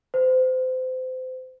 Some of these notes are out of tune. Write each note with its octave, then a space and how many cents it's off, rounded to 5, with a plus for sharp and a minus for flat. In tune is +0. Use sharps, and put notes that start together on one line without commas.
C5 -30